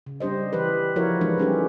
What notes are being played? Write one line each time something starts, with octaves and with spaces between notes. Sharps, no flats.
C#3
G3 D4 G4 C5 D#5
E3 G4 B4
F3 E4 F#4 A#4 C#5
E3 G#3 D4 D#4 B4
G3 C#4 G4 A4